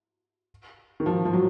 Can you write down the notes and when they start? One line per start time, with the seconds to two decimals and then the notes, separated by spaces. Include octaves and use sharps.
1.00 D#3
1.06 F3
1.25 F3
1.33 F#3